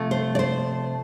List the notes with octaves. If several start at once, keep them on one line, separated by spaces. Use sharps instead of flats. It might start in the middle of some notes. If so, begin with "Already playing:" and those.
Already playing: C3 F3 A3
C5
D5
C5